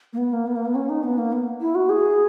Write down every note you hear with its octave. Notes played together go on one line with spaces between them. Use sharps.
A#3
B3
A#3
B3
A#3
B3
C#4
D#4
B3
A#3
B3
E4
F#4
G#4